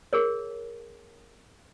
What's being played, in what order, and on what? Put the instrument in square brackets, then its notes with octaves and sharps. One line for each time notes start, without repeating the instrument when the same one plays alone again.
[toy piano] G#4 A#4 C#5